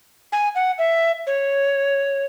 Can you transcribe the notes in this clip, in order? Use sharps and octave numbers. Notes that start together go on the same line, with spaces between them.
G#5
F#5
E5
C#5